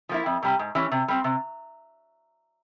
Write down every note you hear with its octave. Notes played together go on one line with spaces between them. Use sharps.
F3 A#3 E4
F2
C3 G3
G#2
E3 G3 C#4
C3
G3 C4
C3